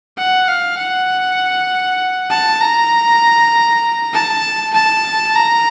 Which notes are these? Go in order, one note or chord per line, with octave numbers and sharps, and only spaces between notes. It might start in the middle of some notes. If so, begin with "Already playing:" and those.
F#5
F5
F#5
A5
A#5
A5
A5
A#5